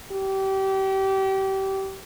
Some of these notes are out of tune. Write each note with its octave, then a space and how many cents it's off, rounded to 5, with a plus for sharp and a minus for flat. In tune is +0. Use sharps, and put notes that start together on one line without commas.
G4 -25